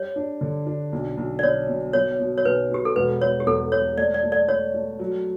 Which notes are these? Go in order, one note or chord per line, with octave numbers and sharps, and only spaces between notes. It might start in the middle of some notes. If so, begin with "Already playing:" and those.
Already playing: G3 C#5
D4
D3
D4
B1
B1
D5
B2 C#5
B2
B2 C#5
B2
C#5
B1 B4
B2 G4
A4
E1 B4
E1 C#5
G4
E2 A4
E1 C#5
A3 D5
D5
A3
D5
A3 C#5
A3
F#3